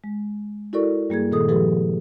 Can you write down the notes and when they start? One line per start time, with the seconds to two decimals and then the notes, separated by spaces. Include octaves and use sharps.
0.04 G#3
0.73 E4 F#4 A4 A#4 D5 C#6
1.09 G2 G3 A#3 G#4 G#6
1.32 A#2 D#3 G#4 A4 D#6
1.48 F3 G#3 G4 A4 B4